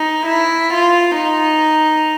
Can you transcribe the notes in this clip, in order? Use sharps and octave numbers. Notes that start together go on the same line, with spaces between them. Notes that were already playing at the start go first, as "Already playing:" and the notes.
Already playing: D#4
E4
F4
D#4